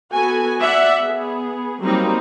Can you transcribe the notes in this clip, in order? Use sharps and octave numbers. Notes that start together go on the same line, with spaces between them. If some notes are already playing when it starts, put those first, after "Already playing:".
B3 F#4 A4 G#5
D5 E5 F#5
B3 G#4
F#3 G3 A#3 C4 D#4